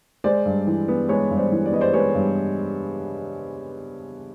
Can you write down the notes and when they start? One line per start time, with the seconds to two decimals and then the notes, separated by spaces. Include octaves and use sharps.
0.24 G#3 C5 D5
0.45 G2
0.67 E3
0.88 B3
1.09 G#3 B4 C#5
1.31 G2
1.37 C5 D5
1.52 E3
1.66 D5
1.72 B3 D#5
1.81 C5 D5
1.93 G#3 B4 C#5
2.15 G2